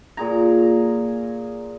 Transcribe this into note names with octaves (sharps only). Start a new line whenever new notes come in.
A#2 G#4 A#5